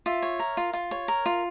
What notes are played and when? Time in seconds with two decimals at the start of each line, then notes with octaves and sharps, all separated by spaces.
0.06 F4 E5
0.22 C#5
0.39 A#4
0.57 F4
0.73 F4
0.91 C#5
1.08 A#4
1.26 F4